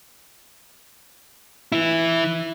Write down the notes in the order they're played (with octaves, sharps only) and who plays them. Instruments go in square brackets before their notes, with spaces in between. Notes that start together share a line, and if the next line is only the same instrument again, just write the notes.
[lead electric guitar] E3 E4